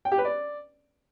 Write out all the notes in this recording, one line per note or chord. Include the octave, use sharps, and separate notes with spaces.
G5
G4
B4
D5